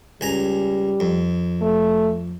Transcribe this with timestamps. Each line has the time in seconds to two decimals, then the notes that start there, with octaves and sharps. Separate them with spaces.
0.21 C#2 G3 G#5 A#5
1.00 F2
1.61 A3